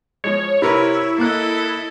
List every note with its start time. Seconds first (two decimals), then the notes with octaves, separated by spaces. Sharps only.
0.24 F3 G#3 C#5
0.62 C3 E4 A#4 B4 C#5
1.18 A#3 A4 D#5 F#6